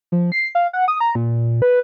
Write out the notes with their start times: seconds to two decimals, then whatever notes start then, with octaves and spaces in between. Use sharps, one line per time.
0.12 F3
0.32 C7
0.55 F5
0.73 F#5
0.88 D#6
1.00 A#5
1.15 A#2
1.62 B4